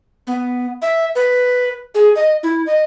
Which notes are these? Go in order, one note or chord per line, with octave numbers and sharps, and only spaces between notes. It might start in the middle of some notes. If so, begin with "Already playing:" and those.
B3
E5
B4
G#4
D#5
E4
D#5